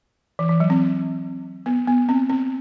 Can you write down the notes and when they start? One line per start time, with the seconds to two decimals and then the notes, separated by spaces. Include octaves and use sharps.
0.39 E3
0.49 E3
0.60 F#3
0.70 C4
1.66 B3
1.87 B3
2.09 C4
2.29 C4